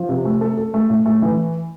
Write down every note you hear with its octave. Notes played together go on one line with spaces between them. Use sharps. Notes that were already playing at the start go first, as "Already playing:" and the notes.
Already playing: F3
C3
A3
A4
A4
A3
A2
A3
E3